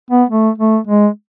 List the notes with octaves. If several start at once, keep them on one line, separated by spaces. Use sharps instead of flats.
B3
A3
A3
G#3